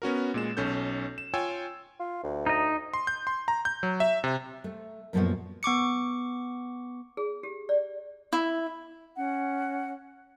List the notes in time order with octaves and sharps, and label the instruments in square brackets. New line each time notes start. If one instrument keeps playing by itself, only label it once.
[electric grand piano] B3 C#4 F#4 A#4
A#2 G#3 E7
B1 C#4 A4 G6
E7
F4 C#5 G5 G#5 E6
[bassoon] F4
D2
[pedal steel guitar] D#4 D#5
[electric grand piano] C6
G6
C6
A#5
G6
F#3
E5
C3
[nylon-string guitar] A3
F#2 A#2 F3 A3 B3 F#4
[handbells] B3 C#6 D6 C#7
[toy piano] G#4
G4
D5
[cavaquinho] E4
[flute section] C#4 F#5